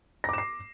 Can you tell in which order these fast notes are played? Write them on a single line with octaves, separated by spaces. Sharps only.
A#6 D6 E7 C7